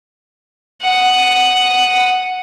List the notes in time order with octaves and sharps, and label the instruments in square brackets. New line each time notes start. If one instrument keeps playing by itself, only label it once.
[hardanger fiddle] F#5 D#6